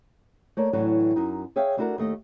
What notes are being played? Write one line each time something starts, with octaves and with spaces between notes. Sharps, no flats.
A3 A#3 C#5 D5
A2 D3 E3 F#3
F#2 D#4
G#4 C#5 E5 F5 G5
A3 D4 E4 F#4 A4 A#4
D#2 A3 D#5